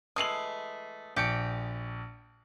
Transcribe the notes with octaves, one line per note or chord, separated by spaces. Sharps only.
E3 G#3 A3 D#6 C7 F#7
A#1 G4 C#7 D7